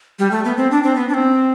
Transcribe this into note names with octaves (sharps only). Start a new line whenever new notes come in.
G3
A3
B3
C4
D4
C4
B3
D4
C4